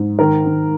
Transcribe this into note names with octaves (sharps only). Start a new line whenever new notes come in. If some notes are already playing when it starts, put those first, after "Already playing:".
Already playing: G#2
D#3 A#4
D#3